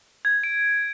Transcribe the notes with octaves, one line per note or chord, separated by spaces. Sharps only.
G#6
D7